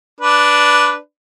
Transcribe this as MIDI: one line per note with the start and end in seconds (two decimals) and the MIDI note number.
0.21 0.97 62
0.21 0.97 71